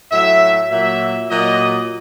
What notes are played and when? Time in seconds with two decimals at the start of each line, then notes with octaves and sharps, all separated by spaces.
0.12 A2 F#3 E5
0.70 A#2 F#3 E5
1.30 A#2 F#3 D#5